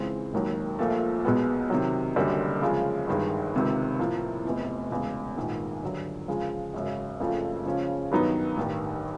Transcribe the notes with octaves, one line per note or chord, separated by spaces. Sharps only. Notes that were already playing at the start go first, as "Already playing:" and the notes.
Already playing: C#2 C#3 E3 G#3 C4
E1 D#2 D#3 F#3
A#1 A#2 F3 A3
B1 B2 G#3 B3
C3 D#3 F#3
F#1 F#2 D3 G3
C#3 F3 G#3
G1 G2 D#3 G#3
C#2 C3 D#3
A2 F3 A#3
F1 E2 C3
E1 E2 C#3
A#1 G#2 D#3
G2 D3 F#3
C#3 F3 G#3
G#1 F#2 C#3
F#1 F2 C#3 F3 A3
C#3 F3 G#3 C#4
G2 D#3 F#3 B3 D#4
A1 G2 D#3